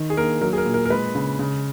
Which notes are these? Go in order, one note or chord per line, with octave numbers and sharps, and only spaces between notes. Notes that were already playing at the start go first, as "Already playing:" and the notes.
Already playing: D#3
G#4
A#3 A#4
F#3 A#4
G#4
A#4
A#2
A#4
A#4
G#3 B4
C#3
C#3